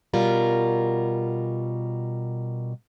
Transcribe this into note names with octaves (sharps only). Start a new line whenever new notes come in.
B2 G3 F4 A#4